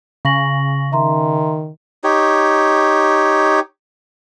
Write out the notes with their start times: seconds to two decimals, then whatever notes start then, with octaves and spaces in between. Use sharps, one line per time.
0.25 C#3 C#6 A#6 F#7
0.92 D#3 E5 A#5 C6
2.04 D#4 G4 C#5